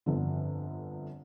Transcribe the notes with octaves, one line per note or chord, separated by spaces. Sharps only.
G1 F2 D3